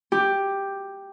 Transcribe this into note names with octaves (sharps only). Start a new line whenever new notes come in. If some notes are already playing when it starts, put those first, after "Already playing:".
G4